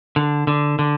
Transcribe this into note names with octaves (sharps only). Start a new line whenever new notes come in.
D3
D3
D3